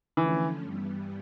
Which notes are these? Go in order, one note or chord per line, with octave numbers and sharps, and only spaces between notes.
D3 E3 F3 A3 C#4
G2 E3 G3 B3